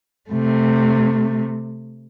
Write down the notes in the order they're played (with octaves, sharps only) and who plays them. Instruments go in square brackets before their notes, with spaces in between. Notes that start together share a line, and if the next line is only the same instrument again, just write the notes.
[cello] C3 A3